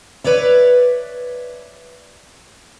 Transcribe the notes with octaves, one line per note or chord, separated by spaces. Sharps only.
B4 C#5 D5 E5